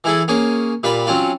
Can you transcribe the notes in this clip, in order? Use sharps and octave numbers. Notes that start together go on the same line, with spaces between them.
E3 E4 G#4 A4
A#3 C#4 G#4
A#2 G3 B4 F5 B5
F#3 C4 C#4 F4